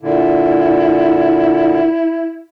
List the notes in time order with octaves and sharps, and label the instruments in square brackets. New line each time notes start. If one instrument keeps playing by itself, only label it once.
[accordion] A#2 D3 [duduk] E4